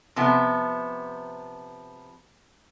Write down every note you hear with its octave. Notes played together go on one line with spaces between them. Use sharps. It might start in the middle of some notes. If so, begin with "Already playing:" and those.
C3 F3 B3